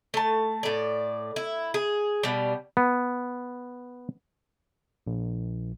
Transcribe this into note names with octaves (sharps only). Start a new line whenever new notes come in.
A3 A5
A2 D5
E4
G#4
B2 G3
B3
A#1